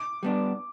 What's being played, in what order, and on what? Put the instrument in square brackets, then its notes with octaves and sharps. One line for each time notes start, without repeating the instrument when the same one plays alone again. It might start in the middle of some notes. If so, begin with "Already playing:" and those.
Already playing: [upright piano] D6
[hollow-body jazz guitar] G3 B3 D4